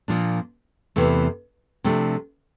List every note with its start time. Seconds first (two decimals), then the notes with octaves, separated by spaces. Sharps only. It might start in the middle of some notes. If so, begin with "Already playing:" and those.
0.08 A#2 F3 A#3 D4
0.96 E2 C3 E3 A3
1.84 C3 F3 A3 D4